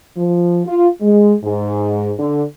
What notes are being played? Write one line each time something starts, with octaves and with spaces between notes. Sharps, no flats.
F3
F4
G#3
G#2
D3